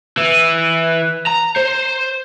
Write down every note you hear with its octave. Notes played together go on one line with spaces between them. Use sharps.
E3
A#5
C5